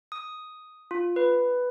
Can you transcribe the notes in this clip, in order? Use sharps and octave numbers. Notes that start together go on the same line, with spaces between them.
D#6
F4
B4